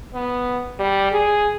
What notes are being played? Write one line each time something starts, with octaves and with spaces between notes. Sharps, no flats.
B3
G3
G#4